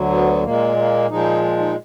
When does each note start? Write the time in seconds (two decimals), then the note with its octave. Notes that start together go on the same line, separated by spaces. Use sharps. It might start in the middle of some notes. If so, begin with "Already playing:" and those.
Already playing: D2 D3 F#3
0.10 B3
0.43 A#2 G#3 A#3
0.77 A#3
1.10 A#2 F3 G#3 D#4
1.59 D#4